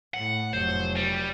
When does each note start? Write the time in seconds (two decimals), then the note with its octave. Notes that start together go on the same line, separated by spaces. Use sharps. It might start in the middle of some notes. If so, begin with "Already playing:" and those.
0.14 A2 F#5
0.53 F1 F#3 C5
0.96 G3